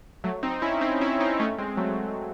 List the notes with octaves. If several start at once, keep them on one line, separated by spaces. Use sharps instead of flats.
F#3 A3
C4 D#4
C#4 E4
C4 D#4
C#4 E4
C4 D#4
A3 C#4
G#3 C4
F#3 A3